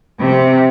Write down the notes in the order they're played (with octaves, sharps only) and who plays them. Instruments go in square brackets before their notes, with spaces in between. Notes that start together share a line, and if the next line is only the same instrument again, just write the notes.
[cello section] C3